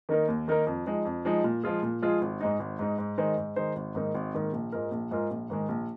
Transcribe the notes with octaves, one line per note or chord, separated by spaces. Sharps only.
D#3 A#3 D#4 A#4
D#2
D#3 A#3 D#4 A#4
F2
F3 G#3 D#4
F2
F3 G#3 D#4
A#2
F3 G#3 F4 G#4
A#2
F3 G#3 F4 G#4
G#1
G#2 G#3 D#4
G#1
G#2 G#3 D#4
G#2
D#3 G#3 D#4 C5
G#2
D#3 G#3 D#4 C5
G#1
G#2 D#3 A#3 D#4
G#1
G#2 D#3 A#3 D#4
A#1
G#2 G#3 F4 A#4
A#1
G#2 G#3 F4 A#4
A#1
G#2 D#3 G#3
A#1